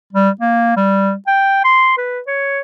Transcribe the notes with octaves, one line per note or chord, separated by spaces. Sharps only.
G3
A#3
G3
G5
C6
B4
C#5